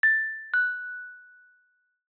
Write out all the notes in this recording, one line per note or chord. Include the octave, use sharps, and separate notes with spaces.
A6
F#6